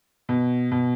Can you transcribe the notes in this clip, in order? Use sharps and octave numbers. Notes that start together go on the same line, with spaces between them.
B2
B2